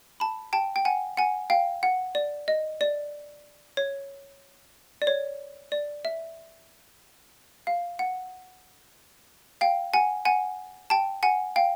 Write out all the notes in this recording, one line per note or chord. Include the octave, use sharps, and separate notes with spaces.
A5 B5
G5 A5
G5
F#5 G#5
F#5 G#5
F5 G5
F#5
D5
D#5
D5
C#5
D5
C#5
D5
E5
F5
F#5
F5 G5
F#5 G#5
F#5 G#5
G5 A5
F#5 G#5
F5 G5